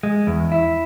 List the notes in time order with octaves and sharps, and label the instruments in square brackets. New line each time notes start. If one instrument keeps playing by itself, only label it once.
[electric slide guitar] G#3
E2
E4